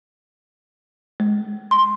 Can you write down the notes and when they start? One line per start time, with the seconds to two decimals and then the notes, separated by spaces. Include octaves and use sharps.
1.20 G#3
1.71 C6